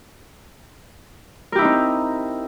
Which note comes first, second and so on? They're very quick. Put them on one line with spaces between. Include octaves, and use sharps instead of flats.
A#4 G4 E4 D#4 C4